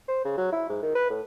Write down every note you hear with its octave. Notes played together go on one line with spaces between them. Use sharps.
C5
C#3
F#3
E4
G#2
D#3
B4
A2